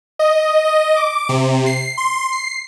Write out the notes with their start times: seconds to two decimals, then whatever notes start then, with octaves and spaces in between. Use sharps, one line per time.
0.19 D#5
0.65 D#5
0.97 D6
1.29 C3
1.66 C7
1.97 C6
2.32 C7